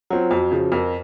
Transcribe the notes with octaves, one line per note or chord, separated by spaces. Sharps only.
F#3 C4 F4
F2 F#4
C#3 F3
F2 A#4